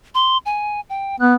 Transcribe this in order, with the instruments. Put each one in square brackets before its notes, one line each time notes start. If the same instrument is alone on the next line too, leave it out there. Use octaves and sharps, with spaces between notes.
[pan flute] C6
G#5
G5
[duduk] B3 [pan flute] F#6